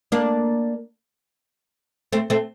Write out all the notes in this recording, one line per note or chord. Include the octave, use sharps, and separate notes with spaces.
A#3 D4
A3 C4
A3 C4